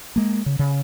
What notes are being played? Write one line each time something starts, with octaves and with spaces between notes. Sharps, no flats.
G#3 A#3
C#3
C#3